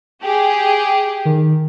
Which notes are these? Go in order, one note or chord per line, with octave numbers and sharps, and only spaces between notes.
G4 G#4
D#3